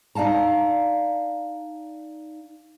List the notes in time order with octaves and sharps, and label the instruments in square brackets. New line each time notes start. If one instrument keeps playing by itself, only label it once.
[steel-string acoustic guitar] D#4 D5 F5 A5 A#5